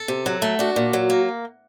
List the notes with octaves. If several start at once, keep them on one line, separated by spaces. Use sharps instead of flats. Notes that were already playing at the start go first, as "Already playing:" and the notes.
Already playing: A4
C3
F#3
A3
D4 F#4
A#2
F#3
A#3